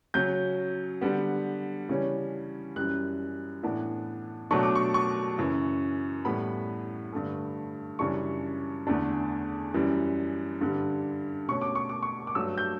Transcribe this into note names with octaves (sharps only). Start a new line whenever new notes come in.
C#3 F#3 C#4 G6
D3 G3 B3
C#3 E3 G3 C#4
F#2 E3 G3 F#6
A2 E3 B3 D4
B2 F#3 A3 D4 C#6
D6
C#6
C#6
F#2 C#3 E3
A2 E3 G3 B3 B5
G2 D3 A3
F#2 C#3 E3 G3 D4 C#6
E2 D3 A3 D4
F#2 E3 G3
G2 D3 G3
B2 A3 C#4 C#6
D6
C#6
D6
C#6
D6
G2 F#3 A3 E6
G6